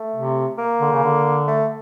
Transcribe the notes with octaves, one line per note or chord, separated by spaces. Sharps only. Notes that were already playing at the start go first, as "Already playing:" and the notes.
Already playing: A3
C3
A#3
D3
C#3
D3
A3